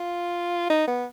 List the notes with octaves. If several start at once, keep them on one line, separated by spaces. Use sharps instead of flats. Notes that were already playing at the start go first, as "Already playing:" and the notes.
Already playing: F4
D#4
B3